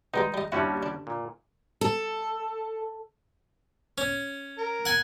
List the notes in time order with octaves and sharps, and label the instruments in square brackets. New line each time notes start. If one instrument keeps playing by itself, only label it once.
[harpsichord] B2 G3 G#3 [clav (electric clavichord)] D#4 [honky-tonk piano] G#4
[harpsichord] G3 D#5
[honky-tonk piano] D#2 D4 A5 [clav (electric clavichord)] G3 C#4 F#4 [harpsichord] E4
[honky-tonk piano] D3 [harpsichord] D4
[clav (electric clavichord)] A#2
[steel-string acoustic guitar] A4
[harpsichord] C#4
[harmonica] A#4
[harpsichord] F#5 G#5